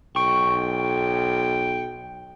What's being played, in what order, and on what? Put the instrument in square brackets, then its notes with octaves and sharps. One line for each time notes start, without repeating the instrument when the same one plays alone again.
[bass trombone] B1 [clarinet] G5 [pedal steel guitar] C#6